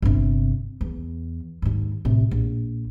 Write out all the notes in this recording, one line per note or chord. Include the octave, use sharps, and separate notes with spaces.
G1 C3
E2
D#2 G#2
A1 C3
A#1